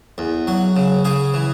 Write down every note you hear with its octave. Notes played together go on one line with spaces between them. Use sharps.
E2
F#3
C#3
C#3 G#4
E3